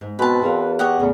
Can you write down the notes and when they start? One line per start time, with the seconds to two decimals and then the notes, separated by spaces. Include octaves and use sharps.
0.01 G#2
0.19 B2 C4 B4 A5
0.42 E2 F#4 A#4 F5
0.79 G4 C#5 D#5 F#5
1.00 E2 A2 C#3